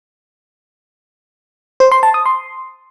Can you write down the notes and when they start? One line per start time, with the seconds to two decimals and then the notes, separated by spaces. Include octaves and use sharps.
1.80 C5
1.92 C6
2.03 A5
2.14 D#6
2.26 C6